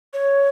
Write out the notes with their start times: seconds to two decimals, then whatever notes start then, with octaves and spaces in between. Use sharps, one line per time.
0.14 C#5